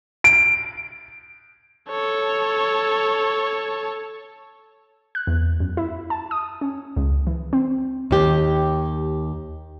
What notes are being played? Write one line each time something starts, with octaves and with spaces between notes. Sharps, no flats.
D7
A4 C#5
F#6
E2
F#2
E4
A5
D#6
C#4
C#2
E3
C4
D#2 G4